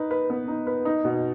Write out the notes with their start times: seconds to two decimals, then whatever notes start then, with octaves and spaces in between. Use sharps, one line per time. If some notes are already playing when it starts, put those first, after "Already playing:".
Already playing: D#4 B4
0.11 B4
0.30 B3
0.48 D#4
0.67 B4
0.85 D#4
1.05 B2